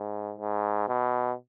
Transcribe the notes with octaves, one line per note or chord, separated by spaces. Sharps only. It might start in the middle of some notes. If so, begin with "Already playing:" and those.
Already playing: G#2
G#2
B2